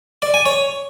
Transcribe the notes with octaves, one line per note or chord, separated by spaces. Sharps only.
D5
G#5
C#5